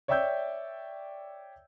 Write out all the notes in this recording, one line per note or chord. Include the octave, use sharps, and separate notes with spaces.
C#5 D5 E5 G5 E6 G6